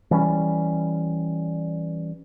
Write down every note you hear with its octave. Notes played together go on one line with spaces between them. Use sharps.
E3 G3 C#4